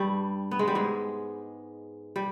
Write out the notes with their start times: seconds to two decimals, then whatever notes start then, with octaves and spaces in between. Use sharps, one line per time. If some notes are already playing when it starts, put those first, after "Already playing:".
Already playing: G2 G3
0.51 B3
0.59 G#3
0.68 G3
0.75 G#2 G#3
2.16 G3